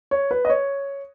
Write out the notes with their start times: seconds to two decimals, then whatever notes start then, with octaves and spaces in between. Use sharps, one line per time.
0.11 C#5
0.31 B4
0.45 D#5
0.50 C#5